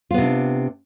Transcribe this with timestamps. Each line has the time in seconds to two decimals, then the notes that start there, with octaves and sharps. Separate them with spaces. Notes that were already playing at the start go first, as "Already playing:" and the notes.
0.11 F4
0.14 B3
0.18 C3
0.22 D4